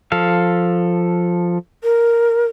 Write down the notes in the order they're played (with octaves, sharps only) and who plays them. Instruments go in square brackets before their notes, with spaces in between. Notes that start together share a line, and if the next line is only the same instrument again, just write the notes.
[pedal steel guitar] F3 A4 F5
[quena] A#4